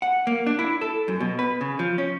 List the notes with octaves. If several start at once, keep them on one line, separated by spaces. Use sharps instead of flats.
F#5
A#3
D4
E4
A4
F#2
B2
B4
C#3
F3
C#4